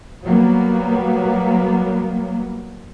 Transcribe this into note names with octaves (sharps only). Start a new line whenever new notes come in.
F#3 G3 A#3 B3